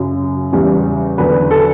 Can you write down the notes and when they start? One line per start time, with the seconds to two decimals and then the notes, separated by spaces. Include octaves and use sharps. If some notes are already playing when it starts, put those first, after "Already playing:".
Already playing: F#2 C#3 F#3
0.52 E2 C#3 E3 G3
1.18 E2 D3 F#3 B4
1.51 A4